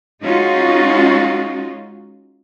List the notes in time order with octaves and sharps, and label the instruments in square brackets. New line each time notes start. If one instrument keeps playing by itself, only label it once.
[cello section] G#3 C#4 D#4 F4 F#4